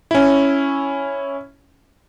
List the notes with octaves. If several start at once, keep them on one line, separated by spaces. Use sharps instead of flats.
C#4 E4